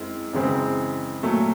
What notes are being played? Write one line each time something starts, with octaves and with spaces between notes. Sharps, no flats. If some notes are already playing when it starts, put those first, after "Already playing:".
Already playing: F#2 G#3 C4 E4
F#2 C#3 E3 G#3 C4
A#2 F#3 A3